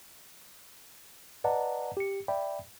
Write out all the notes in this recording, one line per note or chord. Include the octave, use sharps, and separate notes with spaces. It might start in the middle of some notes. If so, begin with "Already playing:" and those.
B4 D5 D#5 F#5 A5 A#5
G4 C#7
D5 E5 G5 B5